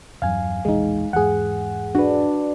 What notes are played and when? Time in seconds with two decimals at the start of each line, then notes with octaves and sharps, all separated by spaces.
0.22 E2 G2 F#3 F5 G#5
0.65 E1 A#1 E2 G#3 D#4
1.13 E2 G#2 G#4 F#5
1.95 D4 F#4 B4